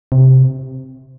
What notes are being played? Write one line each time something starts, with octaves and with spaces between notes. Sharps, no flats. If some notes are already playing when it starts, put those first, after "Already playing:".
C3